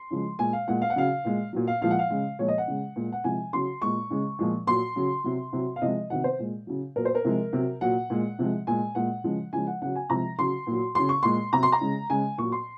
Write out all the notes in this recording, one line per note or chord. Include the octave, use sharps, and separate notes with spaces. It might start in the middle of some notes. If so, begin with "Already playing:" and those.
Already playing: C6
C#3 F3 G#3
A#2 G#3 G#5
F5
A#2 G#3 F#5
F5
F#5
C#3 F#3 F5
A#2 G#3
A#2 F#3
F5
A#2 F3 G#3 F5
F#5
F5
C#3 G#3
A#2 F3 G#3 C#5
D#5
F#5
C#3 G#3
A#2 G#3
F#5
C3 F3 G#3 G#5
C#3 F#3 C6
A#2 G#3 C#6
C#3 G#3
A#2 F3 G#3
A#2 F#3 C6
C#3 F#3
C3 F#3
C3 F#3
F5
C3 F3 G#3 D#5
C3 D#3 F#3 F#5
C5
A#2 G#3
C#3 F#3
A#2 F#3 A#4
C5
A#4
C3 F3 G#3
C3 F#3
A#2 F#3 F#5
A#2 G#3
C3 F3 G#3
A#2 G#3 G#5
A#2 G#3 F#5
C#3 F3 G#3
C#3 F3 G#3 G#5
F#5
C#3 F#3 F#5
G#5
C3 F3 G#3 A#5
C#3 F#3 C6
A#2 F#3
C#3 F#3 C6
C#6
A#2 G#3 C6
C3 F#3 A#5
C6
A#5
C#3 G#3
C#3 G#3 G#5
A#2 F#3 C#6
C6